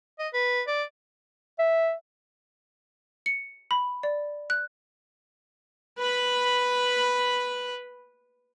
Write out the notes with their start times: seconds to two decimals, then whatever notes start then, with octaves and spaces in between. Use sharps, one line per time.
0.19 D#5
0.34 B4
0.68 D5
1.59 E5
3.26 C#7
3.71 B5
4.03 D5
4.50 F#6
5.99 B4 B5